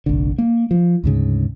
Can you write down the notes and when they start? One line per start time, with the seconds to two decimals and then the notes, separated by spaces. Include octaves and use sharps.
0.06 F1 A#1 D3
0.38 A#3
0.71 F3
1.04 D2 G#2 C#3